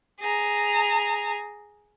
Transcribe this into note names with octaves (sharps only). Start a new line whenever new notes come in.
G#4 A#5